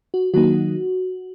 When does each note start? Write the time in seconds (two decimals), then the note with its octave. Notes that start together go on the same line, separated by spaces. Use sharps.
0.14 F#4
0.34 D#3 F#3 A#3 D#4 F#4